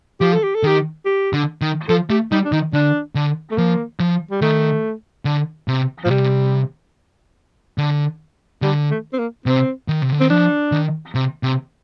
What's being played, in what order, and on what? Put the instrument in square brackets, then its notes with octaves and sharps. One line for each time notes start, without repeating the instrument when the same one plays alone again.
[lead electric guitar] F3 [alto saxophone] G4
[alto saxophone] A4
G4
A4
[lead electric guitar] D#3 [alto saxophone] G4
[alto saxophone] G4
[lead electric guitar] D3
D#3
[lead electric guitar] F3 [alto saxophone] A4
[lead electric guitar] A3 [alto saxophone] G4
[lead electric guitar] G3 [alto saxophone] D#4
[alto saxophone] D4
[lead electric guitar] D#3 [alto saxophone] D#4
[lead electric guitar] D3 [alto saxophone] D4
[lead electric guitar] D3
[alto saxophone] A3
[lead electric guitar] F3 [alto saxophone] A#3
[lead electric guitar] F3
[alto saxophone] G3
[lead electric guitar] D#3 [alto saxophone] A3
[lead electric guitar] D3
C3
[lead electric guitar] A#2 [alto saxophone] F3
[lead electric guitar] C3 [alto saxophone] G3
[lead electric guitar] D3
[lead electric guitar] D3 [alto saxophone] G3
[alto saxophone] A3
C4
A#3
[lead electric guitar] C3 [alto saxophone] C4
[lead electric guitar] D#3
C3
D3
[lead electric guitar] D#3 [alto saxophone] C4
[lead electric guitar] F3 [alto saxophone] D4
[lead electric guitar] D#3
C3
C3